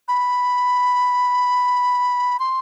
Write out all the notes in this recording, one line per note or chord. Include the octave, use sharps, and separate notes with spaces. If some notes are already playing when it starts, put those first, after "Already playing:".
B5
C6